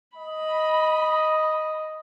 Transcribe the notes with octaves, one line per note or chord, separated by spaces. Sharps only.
D#5 B5